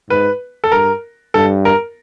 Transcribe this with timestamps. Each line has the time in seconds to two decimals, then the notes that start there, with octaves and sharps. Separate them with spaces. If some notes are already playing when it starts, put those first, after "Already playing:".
0.09 G#2 B4
0.64 A4
0.72 G2 A#4
1.34 G2 A4
1.65 A#4